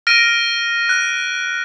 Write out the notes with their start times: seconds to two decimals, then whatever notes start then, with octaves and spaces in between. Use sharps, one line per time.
0.07 F6 A#6 D7 D#7
0.89 F#6